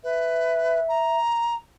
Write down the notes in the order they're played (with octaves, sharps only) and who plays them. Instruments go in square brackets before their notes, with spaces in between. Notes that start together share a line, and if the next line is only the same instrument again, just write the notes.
[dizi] B4 [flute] E5
[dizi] A#5